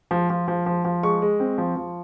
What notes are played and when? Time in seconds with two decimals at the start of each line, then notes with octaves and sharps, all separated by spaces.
0.11 F3
0.30 F3
0.48 F3
0.66 F3
0.85 F3
1.03 G#3 C#6
1.22 G#3
1.40 C4
1.58 F3
1.76 F3